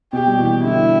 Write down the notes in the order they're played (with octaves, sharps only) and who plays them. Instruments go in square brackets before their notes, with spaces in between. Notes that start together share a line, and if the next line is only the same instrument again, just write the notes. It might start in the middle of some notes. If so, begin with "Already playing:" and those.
[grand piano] B2 [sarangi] G4
[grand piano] G3
B2 E3
[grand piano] D3 G3 [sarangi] E4